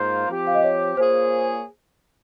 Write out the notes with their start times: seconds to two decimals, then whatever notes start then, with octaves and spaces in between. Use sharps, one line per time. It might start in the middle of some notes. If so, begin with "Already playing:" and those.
Already playing: G#2 A#3 F4 C5
0.29 F3 C4 G4
0.47 F5
0.54 D#5
0.63 C#5
0.97 A#3 F4 G#4 C5 C#5